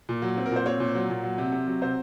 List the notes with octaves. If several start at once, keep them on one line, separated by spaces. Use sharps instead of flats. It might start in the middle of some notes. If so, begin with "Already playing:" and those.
A#2
F#3
C4
A#4
A#2 C5
C4 C#5
A#2
F#3
A#2
F#3
C3
C3
F#3
C3 C5